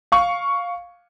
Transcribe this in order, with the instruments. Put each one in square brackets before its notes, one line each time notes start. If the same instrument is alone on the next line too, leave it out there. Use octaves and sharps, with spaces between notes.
[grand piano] F5 C#6